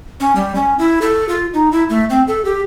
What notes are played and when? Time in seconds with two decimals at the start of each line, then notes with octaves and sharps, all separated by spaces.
0.20 C#4
0.36 G3
0.55 C#4
0.79 E4
1.02 A4
1.29 F4
1.54 D#4
1.72 E4
1.90 A3
2.10 C4
2.28 A4
2.45 G4